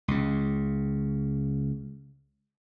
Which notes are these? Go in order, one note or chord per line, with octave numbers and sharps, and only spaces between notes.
C#2 C#3